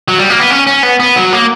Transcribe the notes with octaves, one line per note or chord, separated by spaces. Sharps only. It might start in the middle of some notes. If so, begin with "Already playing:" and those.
F#3
G3
A#3
B3
C#4
C#4
B3
B3
F#3
A#3